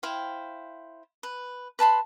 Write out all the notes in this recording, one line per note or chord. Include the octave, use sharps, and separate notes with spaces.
E4 C5 F5 G5
B4
B4 A5 B5 C6